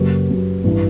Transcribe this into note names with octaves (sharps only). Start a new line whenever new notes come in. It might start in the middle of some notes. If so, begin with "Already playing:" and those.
Already playing: F#1 F#2 F#3 G4 B4
F#1 F#2 F#3
A1 G2 E3